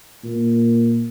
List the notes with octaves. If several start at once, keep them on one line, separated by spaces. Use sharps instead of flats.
A#2